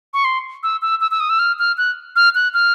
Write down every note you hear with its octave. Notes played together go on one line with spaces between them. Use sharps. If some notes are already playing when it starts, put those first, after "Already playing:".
C#6
C6
E6
E6
E6
E6
D#6
E6
F6
F6
F#6
F6
F#6
F6